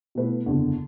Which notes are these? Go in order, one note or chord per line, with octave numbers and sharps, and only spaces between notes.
B2 A3 E4 B4
F#1 E2 D3